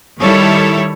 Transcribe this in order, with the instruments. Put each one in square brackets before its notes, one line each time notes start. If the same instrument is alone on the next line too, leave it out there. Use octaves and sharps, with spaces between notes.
[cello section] D#3 G3 E4 A4 C#5